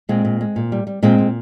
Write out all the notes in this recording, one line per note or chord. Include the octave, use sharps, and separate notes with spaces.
A#2 G#3 C4
A#2
G#3
A#2
G3
G3
A#2 G#3 C4
A#2